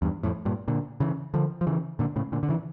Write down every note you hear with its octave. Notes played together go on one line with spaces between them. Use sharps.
E2 G2
F2 A2
G2 A#2
A#2 D3
C#3 E3
D3 F3
F3
C#3 E3
A#2 D3
A2 C#3
A#2 D3
D3
C#3 E3